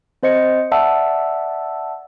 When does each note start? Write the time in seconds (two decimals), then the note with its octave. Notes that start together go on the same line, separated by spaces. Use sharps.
0.23 C4 C5 D#5 C#7
0.72 D5 E5 F#5 A5 E6